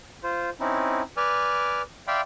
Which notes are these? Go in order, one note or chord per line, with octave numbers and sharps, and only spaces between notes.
F4 C5
C4 C#4 D#4 E4
B4 D5 G#5 D6 F6
D5 E5 F5 G5 B5 C6